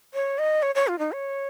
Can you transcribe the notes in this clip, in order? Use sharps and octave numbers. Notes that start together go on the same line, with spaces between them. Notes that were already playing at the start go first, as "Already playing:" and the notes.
C#5
D#5
C#5
C#5
F4
D#4
C#5